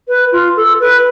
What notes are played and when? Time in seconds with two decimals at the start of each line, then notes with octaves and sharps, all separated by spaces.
0.08 B4
0.32 F4
0.57 A4
0.80 B4